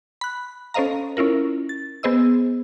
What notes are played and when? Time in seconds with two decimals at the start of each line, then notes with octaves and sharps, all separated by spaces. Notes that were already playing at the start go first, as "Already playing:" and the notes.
0.21 B5 F#6
0.74 C#4 A4 C5 D#5 F5 A#5
1.17 C#4 E4 F4 A#4
1.69 A6
2.03 B3 G#4 C5 D#5 E6